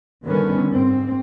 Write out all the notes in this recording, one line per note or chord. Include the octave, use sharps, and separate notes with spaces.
D3 D#3 G3 B3 C#4
G#2 C4